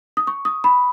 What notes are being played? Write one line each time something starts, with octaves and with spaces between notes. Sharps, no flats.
D#6
C#6
D#6
B5